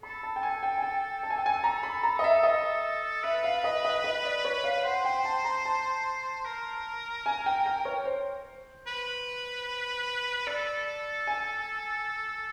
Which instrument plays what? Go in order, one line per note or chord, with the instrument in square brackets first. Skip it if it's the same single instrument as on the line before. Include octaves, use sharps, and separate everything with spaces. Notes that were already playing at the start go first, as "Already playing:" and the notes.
[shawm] A4 [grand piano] B5
[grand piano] A5
G5
G#5
G5
G#5
G5
A5
G#5
G5
G#5
A#5
B5
A#5
D#5
E5
D#5
[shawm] B4 [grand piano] E5
[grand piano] F5
D#5
D#5
D#5
D5
C#5
F5
[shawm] C5 [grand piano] F#5
[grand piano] G5
A5
A#5
A5
[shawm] A#4
[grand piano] G#5
G5
G5
C#5
C5
[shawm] B4
[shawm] A4 [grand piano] D5
[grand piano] G#5